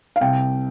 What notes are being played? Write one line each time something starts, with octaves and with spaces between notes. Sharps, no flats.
F5
C2 G5